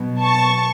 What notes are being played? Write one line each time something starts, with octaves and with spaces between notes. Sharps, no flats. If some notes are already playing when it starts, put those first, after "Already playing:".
Already playing: B2 F#3
A5 C#6